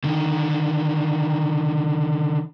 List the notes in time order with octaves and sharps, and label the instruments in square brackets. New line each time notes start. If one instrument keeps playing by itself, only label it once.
[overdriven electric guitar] D3 D#3